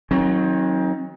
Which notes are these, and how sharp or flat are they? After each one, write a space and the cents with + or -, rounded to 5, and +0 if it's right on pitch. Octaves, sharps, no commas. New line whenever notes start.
D#3 +25 F#3 +0 C4 +45